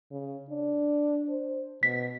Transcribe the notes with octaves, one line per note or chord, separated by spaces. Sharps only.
C#3
D4
C5
B2 B6